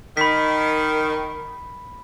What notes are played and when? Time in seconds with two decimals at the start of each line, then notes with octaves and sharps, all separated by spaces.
0.17 D#3 B5 B6